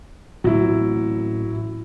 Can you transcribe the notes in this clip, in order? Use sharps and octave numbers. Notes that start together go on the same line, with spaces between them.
A1 A2 F#3 C4 E4